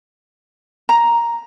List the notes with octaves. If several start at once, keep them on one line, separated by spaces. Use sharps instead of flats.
A#5